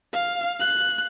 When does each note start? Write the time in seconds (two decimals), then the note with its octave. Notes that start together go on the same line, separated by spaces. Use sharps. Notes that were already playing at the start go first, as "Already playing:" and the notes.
0.14 F5
0.60 F#6